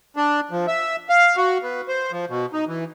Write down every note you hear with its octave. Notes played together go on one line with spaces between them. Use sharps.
D4
F3
E5
F5
F#4
B3
C5
F3
B2
D#4
E3